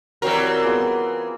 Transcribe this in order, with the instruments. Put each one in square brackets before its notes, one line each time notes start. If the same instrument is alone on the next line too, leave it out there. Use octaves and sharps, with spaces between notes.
[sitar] E3 C4 A#4 [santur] F#3 G3
[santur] B3 F4 G#4